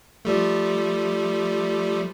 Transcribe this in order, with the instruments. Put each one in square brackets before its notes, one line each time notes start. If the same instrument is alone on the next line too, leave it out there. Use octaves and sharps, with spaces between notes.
[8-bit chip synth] F3 G3 A3